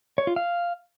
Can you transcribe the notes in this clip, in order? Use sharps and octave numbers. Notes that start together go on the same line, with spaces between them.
C#5
F4
F5